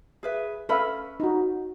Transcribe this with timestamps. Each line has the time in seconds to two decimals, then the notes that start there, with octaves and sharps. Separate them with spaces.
0.23 G#4 B4 E5
0.69 C#4 A4 B4 E5 F5 B5
1.20 D#4 F#4